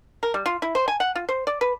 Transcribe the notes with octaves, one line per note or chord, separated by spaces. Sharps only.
A#4
G3
F4
E4
C5
G#5
F#5
F4
C5
D5
B4